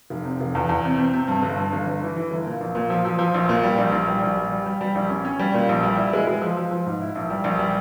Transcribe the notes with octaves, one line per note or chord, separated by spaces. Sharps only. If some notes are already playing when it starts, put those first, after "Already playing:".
F1
C3
F1
E2
E2
C3
C3
C3
G2
G1
G2
G1
G1
E3
E3
G1
A#2
A#1
A#2
F3
F3
F3
A#1
A#2
G3
A#1
A#1
G3
A#1
G3
G3
G3
G3
A#1
C#4
C#4
G3
A#2
A#1
G3
E4
G#3
G#3
F3
F3
F3
G#2
E4
A#1
G3
A#1
G3